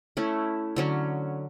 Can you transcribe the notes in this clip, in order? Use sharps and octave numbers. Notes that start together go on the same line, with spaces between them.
A3 C#4 E4
D3 F#3 C#4